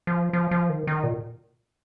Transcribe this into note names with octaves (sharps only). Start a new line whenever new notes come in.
F3
F3
F3
D#3
D#3
A#2